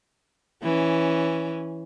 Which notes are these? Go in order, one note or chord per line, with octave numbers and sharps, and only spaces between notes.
E3 C#4